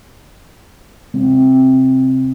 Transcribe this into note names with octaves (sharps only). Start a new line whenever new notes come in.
C3